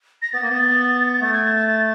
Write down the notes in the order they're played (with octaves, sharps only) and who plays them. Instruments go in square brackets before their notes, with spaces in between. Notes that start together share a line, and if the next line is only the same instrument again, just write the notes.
[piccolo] A#6
[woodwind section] B3 [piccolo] A6
[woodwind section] A#3
B3
[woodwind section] A3 [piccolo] A6
[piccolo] G#6
A6
A6
A6